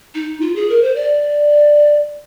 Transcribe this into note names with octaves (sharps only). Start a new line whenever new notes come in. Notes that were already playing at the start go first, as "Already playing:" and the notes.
D#4
F4
G#4
A#4
C5
D5